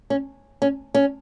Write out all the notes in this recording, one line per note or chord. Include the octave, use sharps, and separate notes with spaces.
C#4
C#4
C#4